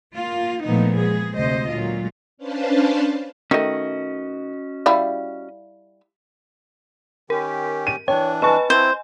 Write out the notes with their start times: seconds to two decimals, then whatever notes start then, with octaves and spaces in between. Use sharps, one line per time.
0.16 A#3 F4
0.65 A#2 E3 F3 A3 B3 D#4
1.00 G#3 B3 G#4
1.37 D2 C3 C5 D#5
1.70 A#2 F#3 G#3 F4
2.37 C#4 D4 B4 C5 F5 A5
3.51 D#3 A3 C#4 F#4 D#5
4.86 G3 E4 F5
7.30 D#3 C#4 G4 A#4
7.87 D#7
8.08 E3 D4 C#5 G5
8.42 B4 D#5 G#5 A5 C#6
8.70 C4 E4 C5